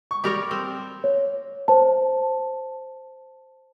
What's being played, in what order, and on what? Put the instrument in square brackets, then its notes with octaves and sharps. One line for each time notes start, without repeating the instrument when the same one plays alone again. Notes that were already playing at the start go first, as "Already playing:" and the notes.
[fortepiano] C#6
[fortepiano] G3 D5 D#6 [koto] G4 A#4 C#5
[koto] C4
[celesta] C#5
C5 A5